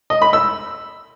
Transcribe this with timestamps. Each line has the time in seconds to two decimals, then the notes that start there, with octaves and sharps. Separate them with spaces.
0.10 D#5
0.22 B5
0.33 E6